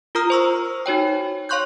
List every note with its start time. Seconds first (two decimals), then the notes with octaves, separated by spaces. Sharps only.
0.15 F4 A#4 A#5 D#6 F6
0.30 C5 C#6 E6
0.86 D#4 F#4 C#5 G5
1.49 C#5 F5 C6 C#6 F#6 G6